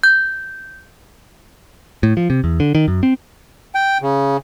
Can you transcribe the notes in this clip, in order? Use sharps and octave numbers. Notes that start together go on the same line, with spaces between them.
G6
A2
F3
C3
E2
D3
D#3
F#2
C4
G5
C#3